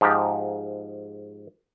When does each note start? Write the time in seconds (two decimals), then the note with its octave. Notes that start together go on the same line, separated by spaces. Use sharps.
0.01 G#2 F3 D#4 G4